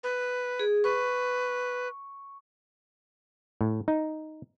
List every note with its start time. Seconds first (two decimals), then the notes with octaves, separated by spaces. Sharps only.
0.04 B4
0.59 G#4
0.84 B4 C#6
3.61 A2
3.88 D#4